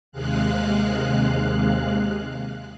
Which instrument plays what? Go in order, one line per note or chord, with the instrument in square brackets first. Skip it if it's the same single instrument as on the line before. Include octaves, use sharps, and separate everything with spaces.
[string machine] D#2 C3 G#3 F5 F#6